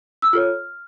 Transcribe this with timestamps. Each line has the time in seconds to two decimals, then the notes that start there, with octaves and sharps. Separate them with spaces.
0.22 E6
0.33 F4 A4 C#5 F6